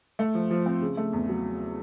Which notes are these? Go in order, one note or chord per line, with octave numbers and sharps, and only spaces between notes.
A3
F3
F3
C4
C#3
A3
E2
F#3